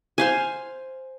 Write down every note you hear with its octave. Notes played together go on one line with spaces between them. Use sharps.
C5 F5 G#5